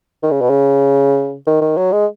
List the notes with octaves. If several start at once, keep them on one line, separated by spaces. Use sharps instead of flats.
D#3
C#3
B2
C#3
D#3
D#3
F#3
G#3